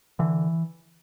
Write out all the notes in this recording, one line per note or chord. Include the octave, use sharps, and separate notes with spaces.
D3 E3